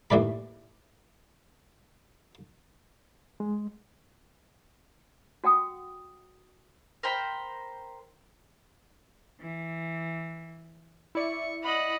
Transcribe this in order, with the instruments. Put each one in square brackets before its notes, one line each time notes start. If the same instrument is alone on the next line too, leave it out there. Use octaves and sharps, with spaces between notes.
[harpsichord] D#2 A2 E3 D5 B5
[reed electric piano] G#3
[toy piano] F#4 F#5 G5 D#6
[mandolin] A#4 C5 G5 B5
[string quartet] E3
[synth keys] E4 D5 [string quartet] C#6
[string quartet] D#5 F#5 B5